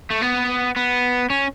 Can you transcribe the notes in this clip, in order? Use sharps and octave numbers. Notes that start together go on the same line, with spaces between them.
A3
B3
B3
C#4